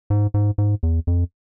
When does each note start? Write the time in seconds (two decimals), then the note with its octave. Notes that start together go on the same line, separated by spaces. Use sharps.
0.10 G#2
0.34 G#2
0.58 G#2
0.83 E2
1.07 F2